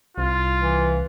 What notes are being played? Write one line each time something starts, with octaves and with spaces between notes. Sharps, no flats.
C2 F4
E3